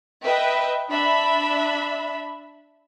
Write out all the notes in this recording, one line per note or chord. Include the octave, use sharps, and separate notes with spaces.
B4 D#5 E5 G5
D4 E5 B5